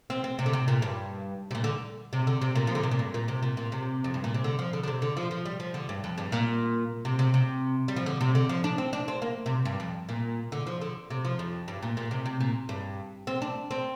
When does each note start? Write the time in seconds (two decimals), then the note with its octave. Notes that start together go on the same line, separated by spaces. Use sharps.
0.10 C4
0.24 C4
0.39 C3
0.46 D3
0.53 C3
0.68 A#2
0.82 G2
1.51 C3
1.55 A#2
1.64 D3
2.13 C3
2.27 D3
2.42 C3
2.55 A#2
2.67 F3
2.75 D3
2.83 C3
2.91 A#2
2.99 G2
3.14 A#2
3.28 C3
3.43 A#2
3.57 A#2
3.72 C3
4.04 F2
4.14 G2
4.24 A#2
4.34 C3
4.44 D3
4.59 F3
4.73 D3
4.83 D3
4.88 C3
5.02 D3
5.17 F3
5.31 F3
5.46 G3
5.60 F3
5.74 D3
5.89 G2
6.04 F2
6.18 G2
6.32 A#2
7.05 C3
7.19 C3
7.34 C3
7.88 G3
7.96 F3
8.06 D3
8.21 C3
8.35 D3
8.49 F3
8.64 D4
8.78 C4
8.93 D4
9.08 C4
9.22 A#3
9.46 C3
9.65 G2
9.80 F2
10.09 A#2
10.52 D3
10.67 F3
10.81 D3
11.10 C3
11.25 F3
11.39 F2
11.68 G2
11.82 A#2
11.97 A#2
12.11 C3
12.26 C3
12.40 A#2
12.69 G2
13.27 C4
13.42 D4
13.71 C4